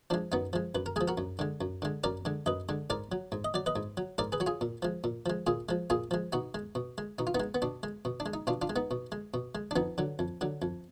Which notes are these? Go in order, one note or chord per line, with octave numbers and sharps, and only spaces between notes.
F3 G#3 D4
F#2 B3 D#4
F3 G#3
F#2 B4
A#4
F3 G#3 G#4
F#4 A#4
F#2
D3 G#3
F#2
D3 G#3
F#2 A#4 D5
D3 G#3
F#2 B4 D#5
D3 G#3
G#2 A#4 D5
F#3
G#2
D#5
F#3 D5
B4 D#5
G#2
F#3
G#2 A#4 D5
G#4 B4
F#3 F#4
F4 G#4
A#2
F3 G#3
A#2
F3 G#3
A#2 F4 G#4
F3 G#3
A#2 F4 G#4
F3 G#3
B2 D#4 F#4
G#3
B2
G#3
B2 D#4
F4
B3 D#4
G#3
B3
B2 D4
G#3
B2
D4
G#3
D#4
B2 D4 F4
D4 F4
G#3
B3 D#4
B2
G#3
B2
G#3
D4
F2 B3 D#4
D3 F#3
F2
D3 F#3
F2